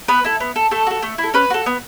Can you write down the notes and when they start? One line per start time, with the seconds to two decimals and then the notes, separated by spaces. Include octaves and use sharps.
0.08 B3 B4
0.24 E4 A4
0.40 B3
0.56 A4
0.71 A3 A4
0.87 F#4 A4
1.03 A3
1.18 E4
1.23 A4
1.34 C#4 B4
1.50 F#4 A4
1.66 B3